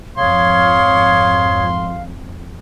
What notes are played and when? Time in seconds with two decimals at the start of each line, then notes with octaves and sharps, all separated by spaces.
0.17 F2 G#2 C#5 F5 C6 D#6 G#6